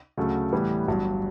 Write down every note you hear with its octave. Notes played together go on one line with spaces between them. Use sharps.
D2 C#3 F#3 A3
A2 E3 G3 B3
G1 G2 F#3